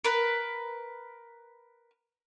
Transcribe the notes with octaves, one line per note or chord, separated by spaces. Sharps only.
A#4 B4